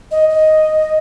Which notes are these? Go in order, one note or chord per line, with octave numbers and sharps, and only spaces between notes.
D#5
D#5